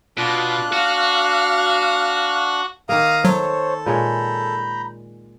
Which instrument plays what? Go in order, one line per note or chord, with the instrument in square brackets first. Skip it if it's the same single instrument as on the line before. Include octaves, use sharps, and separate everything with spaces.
[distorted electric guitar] B2 [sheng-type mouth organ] D4 F#6 [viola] F4
[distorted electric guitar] F#4 [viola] F5
[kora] D#3 A#3 [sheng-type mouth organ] F5 A#5 D#6
[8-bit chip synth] F#3 [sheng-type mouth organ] A4 [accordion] C5 C#5
[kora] A#2 G#3 C#5 [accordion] A#5 B5 G6